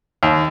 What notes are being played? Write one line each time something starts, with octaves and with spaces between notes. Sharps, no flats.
D#2